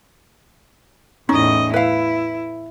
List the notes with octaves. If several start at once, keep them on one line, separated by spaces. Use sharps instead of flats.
E2 A2 C#4 D#4 D#5
E4 B4 F5